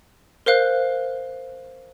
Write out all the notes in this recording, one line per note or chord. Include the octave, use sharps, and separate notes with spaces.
A#4 C5 F5 F#6